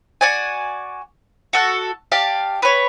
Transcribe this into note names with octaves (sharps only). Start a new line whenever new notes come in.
F#4 D5 G#5
F#4 A4 F#5
G4 D5 F5 A5
B4 C#5